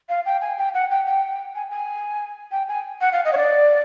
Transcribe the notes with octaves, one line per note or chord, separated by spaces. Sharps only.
F5
G5
G#5
G5
F#5
G5
G5
G#5
G#5
G5
G#5
F#5
F5
D#5
C#5
D5